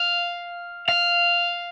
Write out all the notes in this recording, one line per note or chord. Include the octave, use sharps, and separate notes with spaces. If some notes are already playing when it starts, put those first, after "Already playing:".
Already playing: F5
F5